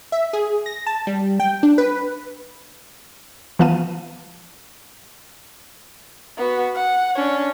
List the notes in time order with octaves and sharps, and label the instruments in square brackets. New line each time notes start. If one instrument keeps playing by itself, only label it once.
[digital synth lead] E5
G#4
A#6
A5
G3
G5
D4
B4
[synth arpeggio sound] E3 F3 B3 F5 A5 D#7
[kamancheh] B3 F#4
F#5
C#4 D4